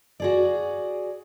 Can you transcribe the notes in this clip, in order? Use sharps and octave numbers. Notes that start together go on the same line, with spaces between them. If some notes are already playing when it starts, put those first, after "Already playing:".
F#4 G#4 D5